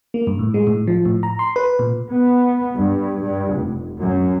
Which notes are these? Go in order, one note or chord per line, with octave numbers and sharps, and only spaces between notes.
A#3
G2
A2
G#3
A2
F3
A2
A#5
C6
B4
A#2
B3
G2
G2
F1
F#2